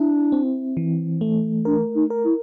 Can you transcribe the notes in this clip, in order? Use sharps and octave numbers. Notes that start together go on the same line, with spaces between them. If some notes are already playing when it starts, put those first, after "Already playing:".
Already playing: D4 E4
C4
E3
A3
D4 A#4
D#4
A#4
E4